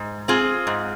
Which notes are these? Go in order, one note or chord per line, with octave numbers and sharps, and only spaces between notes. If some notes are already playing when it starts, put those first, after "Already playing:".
Already playing: G#2
C4 F4 G#4
G#2